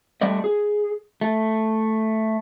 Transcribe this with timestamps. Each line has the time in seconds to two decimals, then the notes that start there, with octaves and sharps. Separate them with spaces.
0.21 G3 A3 D5 D#5
0.44 G#4
1.21 A3